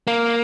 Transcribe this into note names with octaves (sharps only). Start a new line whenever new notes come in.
A#3